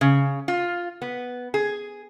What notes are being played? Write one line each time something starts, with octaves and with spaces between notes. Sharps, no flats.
C#3
F4
B3
G#4